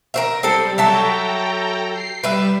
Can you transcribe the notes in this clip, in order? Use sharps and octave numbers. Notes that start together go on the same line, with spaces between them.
A#4 C5 E5
G3 C4 A4
F#3 A4 E5 G5 A5 A#5
C7
G3 B4 E5